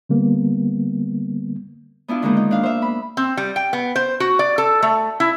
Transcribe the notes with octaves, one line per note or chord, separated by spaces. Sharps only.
D3 G3 A#3 B3
B3 D4 E4 F4
D3 D#3 G#3 A#3 B3 D#4
D#4
D4 F5
C5 E5
B5
C4
G3
G5
B3
C5
F#4
D5
A4
A3
E4